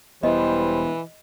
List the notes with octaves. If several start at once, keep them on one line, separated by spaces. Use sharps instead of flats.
E1 E3 G3 B3 E4 C5 D#5